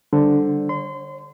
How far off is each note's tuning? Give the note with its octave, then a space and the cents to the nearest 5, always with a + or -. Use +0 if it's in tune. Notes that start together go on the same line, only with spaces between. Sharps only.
D3 +0 G3 +0 C5 +0
C#5 -45 C6 -30